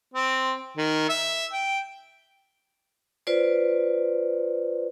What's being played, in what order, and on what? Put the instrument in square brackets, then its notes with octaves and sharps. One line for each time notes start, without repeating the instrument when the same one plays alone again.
[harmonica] C4
D#3
E5
G5
[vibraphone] F4 B4 C5 D5